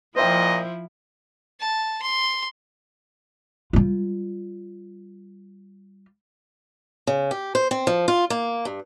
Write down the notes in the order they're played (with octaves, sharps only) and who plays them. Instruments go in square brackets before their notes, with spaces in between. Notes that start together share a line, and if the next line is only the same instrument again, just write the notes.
[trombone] A#2 [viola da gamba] F3 E4 [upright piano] C5 E5 G5 [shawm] D#5
[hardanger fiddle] A5
C6
[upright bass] G3 F4
[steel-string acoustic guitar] C#3
G4
C5
C4
F3
F4
A#3
G2